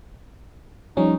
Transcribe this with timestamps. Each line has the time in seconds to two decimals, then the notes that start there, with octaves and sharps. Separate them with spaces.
0.97 F3 G3 C#4 D#4